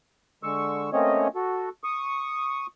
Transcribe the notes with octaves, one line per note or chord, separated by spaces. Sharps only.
D3 G#3 C#6 E6
A3 A#3 C4 C#4 C#5 D#5
F#4 A4
C#6 D#6